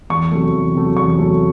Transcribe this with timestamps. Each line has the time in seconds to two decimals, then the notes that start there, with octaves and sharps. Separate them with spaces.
0.10 E2 C#6
0.32 C3 F#3 A3
0.53 E2
0.75 C3 F#3 A3
0.97 E2 C#6
1.18 C3 F#3 A3